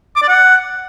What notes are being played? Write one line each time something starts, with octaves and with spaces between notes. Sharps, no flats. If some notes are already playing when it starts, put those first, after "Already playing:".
D6
D5
F#5